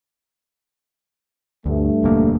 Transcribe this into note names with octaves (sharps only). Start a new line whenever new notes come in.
D2 G2 A3
E1 D2 A#3